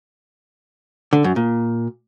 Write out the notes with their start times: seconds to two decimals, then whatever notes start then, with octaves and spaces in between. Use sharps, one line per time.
1.13 D3
1.24 F#2
1.36 A#2